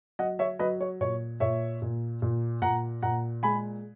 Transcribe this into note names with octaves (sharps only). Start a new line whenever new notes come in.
F#3 D#5 F#5
C#5 E5
F#3 B4 D#5
C#5
A#2 C#5
A#2 C#5 E5
A#2
A#2
A#2 F#5 A#5
A#2 F#5 A#5
G#3 G#5 B5